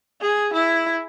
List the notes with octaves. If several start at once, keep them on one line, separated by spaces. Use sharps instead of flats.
G#4
E4